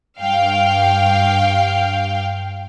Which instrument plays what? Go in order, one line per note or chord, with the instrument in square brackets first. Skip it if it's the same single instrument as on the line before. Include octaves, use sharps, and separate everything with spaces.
[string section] G2 F5 G5